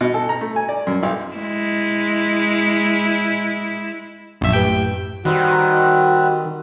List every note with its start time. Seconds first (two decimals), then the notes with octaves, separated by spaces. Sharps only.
0.01 B2
0.14 A4
0.29 A#5
0.41 A3
0.56 G#5
0.69 D5
0.87 F#2
1.03 B1
1.34 G#3 E4
4.41 A#1 F#2 E5
4.53 A2 G4 B4 G5
5.25 D#3 G3 C4 F#4 B4